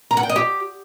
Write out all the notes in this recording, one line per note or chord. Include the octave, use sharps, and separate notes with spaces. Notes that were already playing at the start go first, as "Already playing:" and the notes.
A#5
F#5
G5
D#5
G4